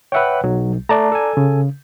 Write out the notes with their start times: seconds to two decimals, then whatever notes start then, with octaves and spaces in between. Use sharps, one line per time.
0.12 B4 C#5 E5 F#5 G5
0.44 B1 F#3
0.89 A3 D5 A5 A#5
1.12 A4 G#5
1.37 C#3